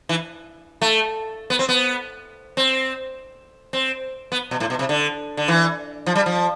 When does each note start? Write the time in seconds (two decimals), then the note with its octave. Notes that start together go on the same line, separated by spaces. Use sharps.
0.09 E3
0.81 A3
1.50 B3
1.59 C4
1.69 B3
2.57 C4
3.73 C4
4.32 B3
4.51 B2
4.60 A2
4.70 B2
4.79 C3
4.89 D3
5.37 D3
5.48 E3
6.06 F3
6.15 G3
6.26 F3